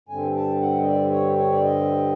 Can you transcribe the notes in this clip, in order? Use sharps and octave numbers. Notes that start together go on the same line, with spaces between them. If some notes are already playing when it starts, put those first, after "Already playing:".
G2 D3 G3 C4 G#5
A5
F#5
D#5
D5
C#5
C#5
D5
D#5